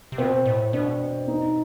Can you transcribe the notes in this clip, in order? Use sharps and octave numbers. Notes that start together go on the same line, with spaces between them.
C3
B2 C4
A2
B2 D4
D#4